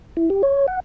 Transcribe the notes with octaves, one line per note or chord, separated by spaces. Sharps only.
E4
G4
C#5
F#5